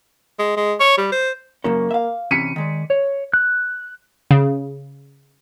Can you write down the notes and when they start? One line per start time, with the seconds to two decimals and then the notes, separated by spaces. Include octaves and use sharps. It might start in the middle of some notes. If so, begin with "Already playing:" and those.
0.39 G#3
0.57 G#3
0.80 C#5
0.98 G3
1.12 C5
1.64 F#2 C#3 A#3 C#4
1.91 E5 F5
2.31 C3 E3 C#4 B6 C#7 D#7
2.56 D#3 G#3 D5
2.90 C#5
3.34 F#6
4.31 C#3